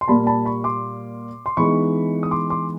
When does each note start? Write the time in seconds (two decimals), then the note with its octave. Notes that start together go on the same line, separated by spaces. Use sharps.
0.01 C6
0.08 A#2 G3 A#3 A5 B5
0.27 A5 B5
0.45 B5 C#6
0.64 C6 D6
1.46 C6
1.57 E3 G#3 B3 D#4 B5 C#6
2.23 D#6
2.31 C6 D6
2.50 C6 D6